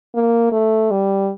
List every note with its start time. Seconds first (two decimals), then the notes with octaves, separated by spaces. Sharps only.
0.15 A#3
0.52 A3
0.91 G3